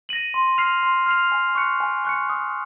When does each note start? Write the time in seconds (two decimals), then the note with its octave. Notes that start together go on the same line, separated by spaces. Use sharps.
0.09 A#6 D#7 F#7
0.34 C6
0.58 F6 C7 F7
0.83 C6
1.06 F6 C7 F7
1.32 G#5
1.55 C#6 F#6 C#7
1.80 G#5
2.05 C#6 F#6 C#7
2.30 D#6